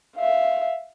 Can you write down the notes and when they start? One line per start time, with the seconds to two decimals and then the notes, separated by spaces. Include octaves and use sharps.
0.16 E5 F5